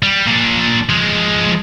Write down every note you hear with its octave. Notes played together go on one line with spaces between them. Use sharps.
G3
A#2 D4
F3 G#3